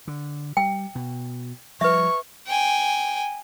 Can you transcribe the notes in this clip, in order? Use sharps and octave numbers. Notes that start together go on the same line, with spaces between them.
D3
G3 G5
B2
F3 G3 B4 E5 C#6
G5 G#5